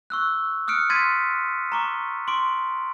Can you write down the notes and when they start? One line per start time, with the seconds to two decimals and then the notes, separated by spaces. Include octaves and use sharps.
0.10 C#6 E6 F#6
0.68 D#6 F6 F#6 C#7 D7
0.90 C6 G#6 A6 B6 D#7
1.72 A#5 C#6 D6
2.28 C6 D6 D7